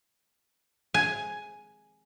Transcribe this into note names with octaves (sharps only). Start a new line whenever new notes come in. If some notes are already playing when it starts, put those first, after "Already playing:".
G#5